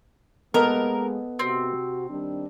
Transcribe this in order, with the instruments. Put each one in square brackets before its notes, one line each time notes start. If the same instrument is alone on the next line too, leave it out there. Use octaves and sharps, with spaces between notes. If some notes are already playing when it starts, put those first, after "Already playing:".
[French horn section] G#3 A#3 [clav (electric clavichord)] B3 A4 D#5 [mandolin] A#4
[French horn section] C3 F#4 [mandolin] C4
[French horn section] D#3 G3 D4